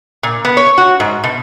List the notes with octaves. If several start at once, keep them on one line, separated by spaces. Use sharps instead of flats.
A#2
B3
C#5
F#4
G#2
B2